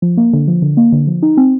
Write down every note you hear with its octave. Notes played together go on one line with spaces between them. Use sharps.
F3
A#3
D3
F3
D3
A#3
D3
F3
D#4
C4